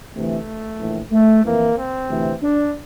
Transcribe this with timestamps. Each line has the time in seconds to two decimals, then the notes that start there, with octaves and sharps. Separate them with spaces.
0.14 D2 C3 E3 A3
0.80 A#1 A2 E3
1.12 A3
1.44 F2 E3 A#3
1.77 C4
2.09 D2 C3 E3
2.42 D4